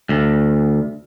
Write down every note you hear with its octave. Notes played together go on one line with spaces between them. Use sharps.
D2